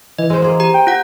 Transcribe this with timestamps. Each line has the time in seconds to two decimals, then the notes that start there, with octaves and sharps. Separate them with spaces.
0.19 E3 D#5
0.30 G#3 C5
0.42 A#3 G#4
0.60 G4 A#5
0.74 G5
0.87 F4 F#5 G6